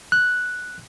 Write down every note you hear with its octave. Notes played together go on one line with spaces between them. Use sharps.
F#6